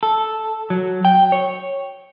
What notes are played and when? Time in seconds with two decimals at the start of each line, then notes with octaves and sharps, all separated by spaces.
0.03 A4
0.70 F#3
1.05 G5
1.32 C#5